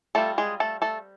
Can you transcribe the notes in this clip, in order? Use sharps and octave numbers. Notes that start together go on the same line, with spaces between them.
G3 A3 C4 F4 A4
G#3 G#4
A3 A4
A3 A4